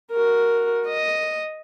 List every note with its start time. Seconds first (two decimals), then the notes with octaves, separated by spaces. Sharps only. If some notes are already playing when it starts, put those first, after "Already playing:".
0.11 F#4 A#4
0.87 D#5